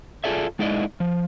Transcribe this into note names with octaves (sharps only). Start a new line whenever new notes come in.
F4 G#4 A4 D5 E5
G#3 D#4 E4 D5 D#5
F3